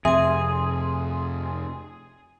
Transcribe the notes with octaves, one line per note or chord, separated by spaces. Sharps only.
F2 C3 G#4 E5 G#5 C6